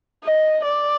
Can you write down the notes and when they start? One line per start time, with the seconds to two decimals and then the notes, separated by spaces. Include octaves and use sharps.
0.25 D#5
0.64 D5